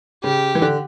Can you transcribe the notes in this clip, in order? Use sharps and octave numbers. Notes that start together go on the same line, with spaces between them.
C#3 G4
E3
D3